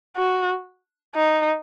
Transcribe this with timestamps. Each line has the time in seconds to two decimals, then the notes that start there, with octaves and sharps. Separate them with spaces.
0.16 F#4
1.15 D#4